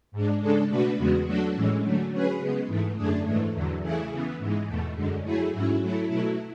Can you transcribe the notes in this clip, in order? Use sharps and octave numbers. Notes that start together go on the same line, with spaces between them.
G#2 G#3 D4
C#3 G#3 D4 A4
B2 A3 D4 F#4 B4
E2 C#3 G#3 B3 F#4
F#3 A3 D4 F#4 A4
A2 E3 G#3 C#4
D3 F#3 A3
F#3 C#4 G#4 B4
C#3 G#3 B3
G#2 E3 A3
F#2 D3 A3 D4 G#4
G#2 E3 A3
E2 D3 F#3
C#3 E3 A3 E4 G#4
C#3 E3 B3
G#2 E3 G#3
E2 B2 A3
F#2 D3 G#3
F#3 A3 E4 G#4
G#2 F#3 C#4 E4
F#3 A3 E4
B2 F#3 A3 E4